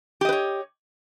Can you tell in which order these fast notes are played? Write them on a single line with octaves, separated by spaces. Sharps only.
G4 D#5 B4 C#5